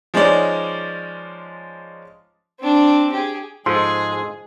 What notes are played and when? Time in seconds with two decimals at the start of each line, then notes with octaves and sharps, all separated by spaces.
0.14 F3 G#3 C#4 D#4 D5
2.60 C4 D4
3.12 G4 G#4
3.66 G#2 F3 G#3 G#4 A4 C6